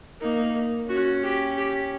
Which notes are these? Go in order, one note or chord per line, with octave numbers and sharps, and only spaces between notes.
A#3 D#4
C#4 F#4
G4
G4